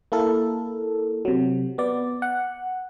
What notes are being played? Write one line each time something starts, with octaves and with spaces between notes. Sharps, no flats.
A#3 E4 A4 A#4
C3 F#3
B3 D5
F#5